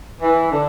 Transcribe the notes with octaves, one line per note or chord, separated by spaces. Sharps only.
E3
D3